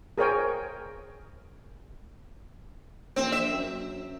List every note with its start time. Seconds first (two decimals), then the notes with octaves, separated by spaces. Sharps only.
0.18 G#4 A#4 C5 C#5 G5 G#5
3.16 A#1 C4
3.32 E5
3.51 F#2